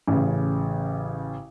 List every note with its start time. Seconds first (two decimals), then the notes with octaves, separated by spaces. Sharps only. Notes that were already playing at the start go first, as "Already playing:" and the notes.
0.08 A1 C#3